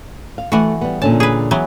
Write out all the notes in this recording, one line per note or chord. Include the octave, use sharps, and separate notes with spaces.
F5
E3 A3 F#4 F#5
G3 B3
A#2 D3 C#4 A5
G#4 B4
E3 F#3 B3